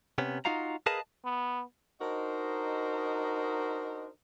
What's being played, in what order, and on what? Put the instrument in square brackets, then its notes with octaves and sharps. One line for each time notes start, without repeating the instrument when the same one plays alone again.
[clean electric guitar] C3 B3 C#4
D#4 F4 F#4 F5 A#5
G#4 A#4 B4 D#5 F5 A5
[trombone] B3
[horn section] D4 D#4 F#4 A#4 C5 D#5